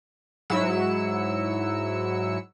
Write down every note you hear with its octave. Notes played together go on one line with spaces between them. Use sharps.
G#2 F#3 E4 E6 C#7